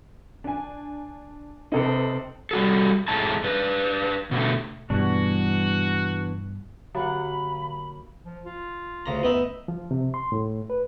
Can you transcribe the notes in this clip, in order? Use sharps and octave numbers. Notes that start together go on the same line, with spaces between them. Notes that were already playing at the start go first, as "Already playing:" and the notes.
D4 G#5
C3 D#4 A4 B4
G3 F#4 A4
F2 A2 G#3 A3 D#4 A5
D4 B4
B2 D3 A3
G2 B2 E3 G3 B3 D4 F#4
D3 F#3 A#3 F#5 B5
F3
F4
D2 C#3 A#5
F#2 B3 D#4 E5
F3
C3
C6
A2
B4